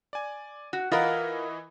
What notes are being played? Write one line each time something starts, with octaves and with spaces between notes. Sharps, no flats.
D5 G#5
F#4
E3 F4 A#4 D#5 F#5 B5